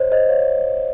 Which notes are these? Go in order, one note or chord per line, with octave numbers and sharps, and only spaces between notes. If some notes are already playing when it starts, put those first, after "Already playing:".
Already playing: C5 C#5 D#5
C5 D#5
C#5 F5